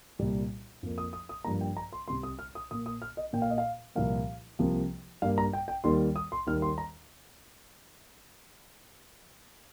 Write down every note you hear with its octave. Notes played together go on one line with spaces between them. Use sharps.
C2 A#2 G3
F2 F3 A#3
D#6
D#6
D#6
G2 F3 A#3 A#5
G5
A#5
C6
C2 C3 G3 C6
D#6
F6
D#6
A#2 A#3 D#6
D#6
F6
D#5
A#2 A#3 G5
F5
D#5
F5
C2 A#2 F3 A#3 F5
C2 C3 F3 A#3
G2 G3 A#3 F5
A#5
G5
G5
D#2 D#3 G3 A#3 C6
D#6
C6
D#2 D#3 G3 A#3 F6
C6
A#5